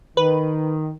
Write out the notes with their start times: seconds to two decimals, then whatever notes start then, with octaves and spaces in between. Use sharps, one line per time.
0.17 D#3 B4